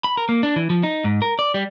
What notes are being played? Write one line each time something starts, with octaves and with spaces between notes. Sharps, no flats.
B5
A#4
A#3
D4
E3
F3
D#4
G#2
A#4
D5
G3